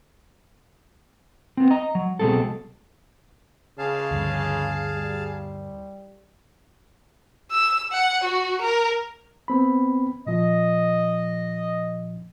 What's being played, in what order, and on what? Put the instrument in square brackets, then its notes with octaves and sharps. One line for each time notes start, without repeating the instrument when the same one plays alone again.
[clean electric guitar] B3 C4
D#5 A#5
F#3
C2 B2 F#3 G#3 C4 A4
[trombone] C#3 [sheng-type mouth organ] G#4 F5 A5
[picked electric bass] D2 G2
[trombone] G3
[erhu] E6
F#5
F#4
A#4
[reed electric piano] B3 C4 B5
[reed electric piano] A#2 F3 [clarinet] D#5